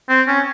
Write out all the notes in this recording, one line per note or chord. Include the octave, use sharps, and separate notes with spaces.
C4
C#4